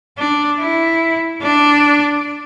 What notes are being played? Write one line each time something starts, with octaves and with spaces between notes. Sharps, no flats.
D4
E4
D4